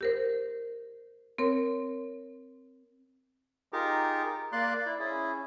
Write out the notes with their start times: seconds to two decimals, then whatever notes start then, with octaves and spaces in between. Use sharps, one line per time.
0.01 G4 A#4 C5
1.38 C4 A#4 C#5
3.72 D#4 F4 G4 G#4 A#4
4.52 A#3 D5 C6 F#6
4.86 E4 D5
4.99 C#4 E4 G#4